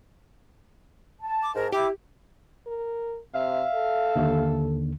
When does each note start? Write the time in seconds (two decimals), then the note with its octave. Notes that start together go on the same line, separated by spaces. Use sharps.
1.21 A5
1.43 D6
1.55 G#2 A#4
1.72 E4 G4 G5 D6
2.67 A#4
3.34 C3 E5 F5
3.75 A4
4.16 D#2 D3